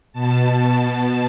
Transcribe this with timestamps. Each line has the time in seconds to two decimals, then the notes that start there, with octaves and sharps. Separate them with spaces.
0.13 B2 A5